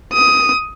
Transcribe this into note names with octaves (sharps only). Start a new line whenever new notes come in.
D#6